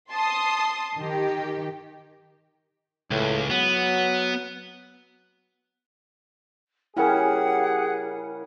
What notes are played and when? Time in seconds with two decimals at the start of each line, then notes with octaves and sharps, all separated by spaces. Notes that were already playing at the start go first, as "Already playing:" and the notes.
0.10 A5 C6 D#6
0.96 D#3 G4
3.11 C#2 A2
3.50 F#3 B3
6.97 C#3 G3 C#4 E4 G4 G#4 A#4 F#5